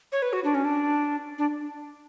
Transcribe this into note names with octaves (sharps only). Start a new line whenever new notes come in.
C#5
B4
F#4
D4
C#4
D4
D4